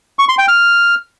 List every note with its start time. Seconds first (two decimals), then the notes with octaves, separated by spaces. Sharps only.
0.19 C#6
0.29 C6
0.38 G5
0.48 F6